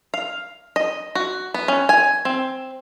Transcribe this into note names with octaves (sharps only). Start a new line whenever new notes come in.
F5
D#5
F#4
B3
C#4
G#5
C4